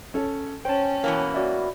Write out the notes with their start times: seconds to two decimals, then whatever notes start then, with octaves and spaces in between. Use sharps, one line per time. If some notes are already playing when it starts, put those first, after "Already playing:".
0.14 C#4 A4 C#5
0.65 C#4 C5 G5 A5
1.04 B2 E3 A#3
1.34 F#4 D5 E5